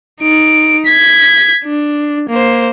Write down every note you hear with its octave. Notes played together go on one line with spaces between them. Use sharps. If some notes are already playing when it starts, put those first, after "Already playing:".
D#4 D7
G#6 B6
D4
A#3 C5